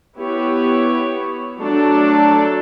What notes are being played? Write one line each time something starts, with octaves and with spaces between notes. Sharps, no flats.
B3 E4 G4 C#5
F#3 A3 D4 A4 D5